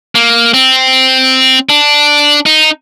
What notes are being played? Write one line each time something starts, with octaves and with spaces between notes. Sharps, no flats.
A#3
C4
D4
D#4